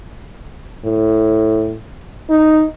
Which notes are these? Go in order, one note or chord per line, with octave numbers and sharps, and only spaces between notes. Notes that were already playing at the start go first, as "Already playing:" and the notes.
A2
D#4